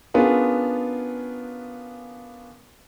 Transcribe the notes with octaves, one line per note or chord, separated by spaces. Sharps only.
B3 C#4 D4 F4 G#4 A#4